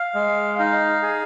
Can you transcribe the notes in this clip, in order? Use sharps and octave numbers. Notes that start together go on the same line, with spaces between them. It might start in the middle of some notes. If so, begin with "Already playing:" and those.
Already playing: F5
G#3
D#4 F5
G#4